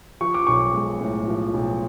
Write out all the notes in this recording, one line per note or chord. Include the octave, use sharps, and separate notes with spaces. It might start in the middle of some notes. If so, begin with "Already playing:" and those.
F3 C#6
D6
B1 C#6
G#3
A2
F3
B1